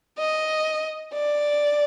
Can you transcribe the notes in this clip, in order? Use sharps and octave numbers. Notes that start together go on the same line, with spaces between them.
D#5
D5